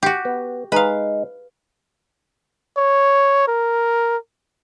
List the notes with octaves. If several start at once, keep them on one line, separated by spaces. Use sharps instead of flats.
F#4 G4
B3
G#3 D#4 B4 F5
C#5
A#4